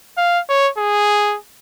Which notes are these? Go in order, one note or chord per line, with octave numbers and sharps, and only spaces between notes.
F5
C#5
G#4